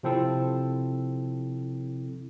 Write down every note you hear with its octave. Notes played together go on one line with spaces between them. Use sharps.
C3 F3 C4 E4 A4